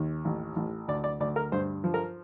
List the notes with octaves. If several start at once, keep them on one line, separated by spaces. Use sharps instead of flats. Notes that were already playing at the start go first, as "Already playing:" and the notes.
Already playing: D#2
A1
A1
D2 D5
D5
D2 D5
A#4
G2 C5
F3
A#4